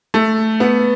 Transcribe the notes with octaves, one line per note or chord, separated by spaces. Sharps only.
A3
B3